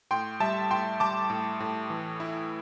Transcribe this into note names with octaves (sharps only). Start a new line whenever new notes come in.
A2 G5 C6
G3 E5 A5
A2 G5 C6
G3 A5 D6
A2
A2
E3
E4